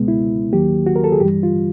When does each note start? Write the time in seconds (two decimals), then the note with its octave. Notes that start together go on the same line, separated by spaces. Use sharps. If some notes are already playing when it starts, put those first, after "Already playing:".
Already playing: C#2 B2 G#3 B3
0.08 E4
0.53 D#2 D#3 F#3 A#3 G4
0.86 F#4
0.96 A#4
1.04 A4
1.12 G#4
1.20 G2 E3 G3 G4
1.43 F4